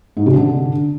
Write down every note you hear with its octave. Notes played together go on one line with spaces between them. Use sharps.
G#2
C3
D3